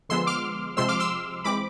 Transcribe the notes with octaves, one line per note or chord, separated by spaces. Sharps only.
D3 F3 G#3 B3 C6 E6
D6 F6
C3 F3 G#3 C4 C6 E6
D6 F6
C6 E6
E3 G#3 C4 B5 D6